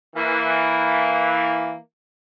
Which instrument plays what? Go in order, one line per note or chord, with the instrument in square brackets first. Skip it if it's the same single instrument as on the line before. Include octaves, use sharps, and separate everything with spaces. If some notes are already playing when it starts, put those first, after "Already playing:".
[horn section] E3 A#3